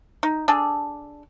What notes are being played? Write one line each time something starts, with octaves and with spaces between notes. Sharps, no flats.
D#4
D4 G#4 A4